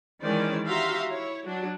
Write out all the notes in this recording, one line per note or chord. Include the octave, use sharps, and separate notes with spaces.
D#3 E3 G#3 C#4 C5 D5
F#4 G4 E5 F5 A#5 C6
E4 C#5
F#3 D4 F#4